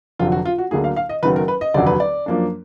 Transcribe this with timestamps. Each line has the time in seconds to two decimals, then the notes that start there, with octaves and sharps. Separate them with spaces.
0.19 F1 F2 D3 F#3 F4
0.32 F#4
0.45 F4
0.58 F#4
0.71 D2 D3 F#3 A#3 G#4
0.84 F5
0.96 F5
1.09 D#5
1.23 F#1 F#2 D#3 F#3 B3 B4
1.36 A#4
1.48 B4
1.61 D#5
1.74 F1 D#2 D3 F#3 D5
1.87 B4
2.00 D5
2.26 F#2 F3 A#3 D4